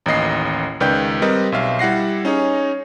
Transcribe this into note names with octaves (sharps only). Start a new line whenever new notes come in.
A1 D#2 D#5 C7
C#2 D#3 B4 D5 G5 G6
G3 C4 A#4 B4 D#5
B1 E5 F5
G3 E4 F#5 A#6 C7
C#4 D#4 G#4 C#5